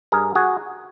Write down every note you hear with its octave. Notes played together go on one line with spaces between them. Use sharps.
G2 G#4 A#4
F#4 G#4